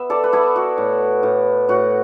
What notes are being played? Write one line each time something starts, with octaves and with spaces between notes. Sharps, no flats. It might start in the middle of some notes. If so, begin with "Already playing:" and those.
Already playing: B3 E5
A4 D5
B4
B3 E4 A4
F#4
A2
A2
A2 F#4